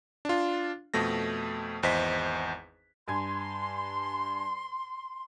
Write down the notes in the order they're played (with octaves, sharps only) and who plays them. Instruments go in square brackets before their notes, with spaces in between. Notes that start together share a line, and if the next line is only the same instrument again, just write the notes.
[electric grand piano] D4 F4
F2 B2 A3 A#6
G#1 E2 C5 D#5 B6
[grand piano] G2 G#5 G#6 [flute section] C6